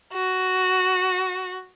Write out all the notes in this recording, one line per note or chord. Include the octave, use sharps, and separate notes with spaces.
F#4